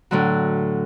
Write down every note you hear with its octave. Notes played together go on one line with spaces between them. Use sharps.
A2 D3 F#3